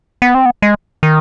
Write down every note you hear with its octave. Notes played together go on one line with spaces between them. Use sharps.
B3
C4
B3
G#3
D#3